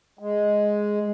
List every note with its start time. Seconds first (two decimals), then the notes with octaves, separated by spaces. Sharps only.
0.19 G#3